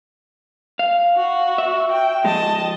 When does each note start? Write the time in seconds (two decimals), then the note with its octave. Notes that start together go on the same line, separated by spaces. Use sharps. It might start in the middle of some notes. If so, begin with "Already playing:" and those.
0.79 F5
1.16 F#4
1.58 E5
1.91 G5
2.25 F3 G#3 D#5 A5